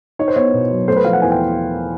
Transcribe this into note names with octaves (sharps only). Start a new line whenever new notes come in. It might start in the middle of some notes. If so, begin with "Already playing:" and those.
D#4 C#5
C5
B3 C#5
B2
F#3
A3 C5
B4
F3 F5
F#5
E2 G#5
G5